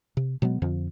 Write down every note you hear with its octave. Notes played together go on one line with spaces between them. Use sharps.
C3
B2 F#3 G#3 B3
F2 D3 F3